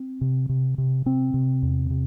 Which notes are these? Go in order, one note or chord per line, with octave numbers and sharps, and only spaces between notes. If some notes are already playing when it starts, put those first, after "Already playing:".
Already playing: C4
C3
C3
C3
C3 C4
C3
E2
C3